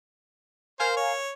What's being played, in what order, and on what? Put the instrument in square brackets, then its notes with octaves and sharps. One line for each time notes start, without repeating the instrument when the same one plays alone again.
[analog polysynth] A#4 F5 G#5 [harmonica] C5
[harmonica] C#5